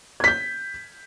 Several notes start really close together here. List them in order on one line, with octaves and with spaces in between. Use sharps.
G#6 B6 G6